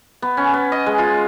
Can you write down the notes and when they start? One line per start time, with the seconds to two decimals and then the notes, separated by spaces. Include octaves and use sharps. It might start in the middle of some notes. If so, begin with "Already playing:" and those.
0.22 B3
0.37 C#4
0.54 B3
0.72 D#5
0.86 G#3
0.98 F4